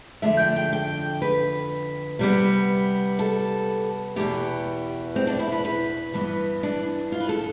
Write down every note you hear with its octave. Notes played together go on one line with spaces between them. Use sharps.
F2 D3 A3 E5
G5
G5
G5
B4
C3 G3 B3
A4
E2 B2 B3 G4
C4
D4
E4
B4
B4
G2 E3 B3
D4
F4
B4
A4